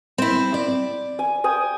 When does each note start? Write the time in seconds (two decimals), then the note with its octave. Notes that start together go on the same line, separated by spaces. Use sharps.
0.18 C4 E4
0.54 D5
1.19 G#5
1.44 G5 G#5 D#6